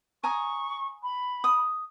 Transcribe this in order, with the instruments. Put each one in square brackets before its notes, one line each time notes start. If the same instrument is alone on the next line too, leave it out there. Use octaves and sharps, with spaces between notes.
[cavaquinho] G#5 A#5 D#6 [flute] C#6
[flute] B5
[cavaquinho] D#6